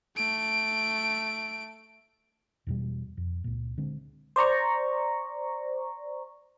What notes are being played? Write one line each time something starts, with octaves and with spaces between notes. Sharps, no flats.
A3 D7
E2 B2 G3
F2
C#2 A#2
D3 G#3 C4
C5 D5 A#5 C#6